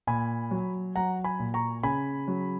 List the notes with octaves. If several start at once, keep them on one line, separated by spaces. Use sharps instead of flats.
A#2 G#5 B5
F#3
F#3 F#5 A#5
G#5 B5
A#2
A#5 C#6
C#3 G#5 B5
F#3